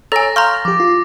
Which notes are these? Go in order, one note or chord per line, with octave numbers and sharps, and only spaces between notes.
A4 C#5 G#5 A#5 E6 A6 A#6
F5 A#5 C6 C#6 F6 G6
F3 G4 D6
F4